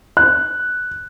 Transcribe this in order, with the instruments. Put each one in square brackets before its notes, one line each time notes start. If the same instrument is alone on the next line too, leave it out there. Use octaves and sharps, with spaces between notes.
[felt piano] F#6